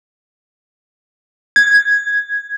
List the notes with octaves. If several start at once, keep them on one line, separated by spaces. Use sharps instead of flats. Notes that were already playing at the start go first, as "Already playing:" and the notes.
G#6